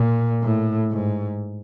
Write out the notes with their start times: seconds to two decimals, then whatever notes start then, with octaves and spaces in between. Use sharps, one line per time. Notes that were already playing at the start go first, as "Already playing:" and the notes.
Already playing: A#2
0.42 A2
0.91 G#2